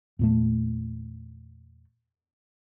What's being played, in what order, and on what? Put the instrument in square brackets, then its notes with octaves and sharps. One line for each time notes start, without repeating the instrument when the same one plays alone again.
[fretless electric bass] E2 A#2 A3